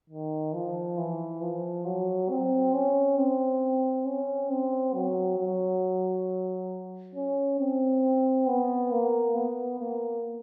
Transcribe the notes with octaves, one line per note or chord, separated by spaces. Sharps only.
D#3
F3
E3
F3
F#3
C4
C#4
C4
C#4
C4
F#3
F#3
C#4
C4
B3
A#3
B3
A#3